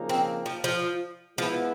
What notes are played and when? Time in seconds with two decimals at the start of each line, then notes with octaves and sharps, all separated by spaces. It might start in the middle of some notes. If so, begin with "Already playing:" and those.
Already playing: C#3 F3 A#3 D#4
0.09 C4
0.46 F3
0.64 F3
1.38 F3 G#3 B3 E4